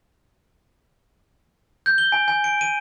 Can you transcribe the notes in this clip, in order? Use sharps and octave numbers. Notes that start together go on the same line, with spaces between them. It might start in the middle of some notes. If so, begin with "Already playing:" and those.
G6
G7
G#5
G#5
D7
D#7